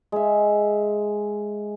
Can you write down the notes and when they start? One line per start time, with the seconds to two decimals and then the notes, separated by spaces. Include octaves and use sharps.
0.12 G#3 E5